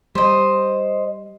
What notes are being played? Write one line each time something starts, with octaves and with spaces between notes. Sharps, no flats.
G3 C5 D#5